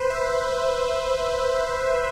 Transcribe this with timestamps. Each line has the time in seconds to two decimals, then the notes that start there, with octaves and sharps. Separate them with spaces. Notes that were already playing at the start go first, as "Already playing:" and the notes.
Already playing: B4 C5
0.10 E5